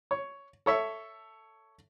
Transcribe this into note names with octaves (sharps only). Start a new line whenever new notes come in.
C#5
A4 C#5 E5